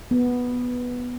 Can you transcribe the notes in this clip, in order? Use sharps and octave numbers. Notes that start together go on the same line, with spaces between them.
B3